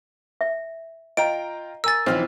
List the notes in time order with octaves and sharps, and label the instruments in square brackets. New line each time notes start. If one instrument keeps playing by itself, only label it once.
[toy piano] E5
[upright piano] F4 G5 A#5 [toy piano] D#5 [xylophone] D7
[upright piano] A#4 G#5 [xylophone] E6 A6
[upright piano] B1 D#4 F6 [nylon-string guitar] E3 F3 C4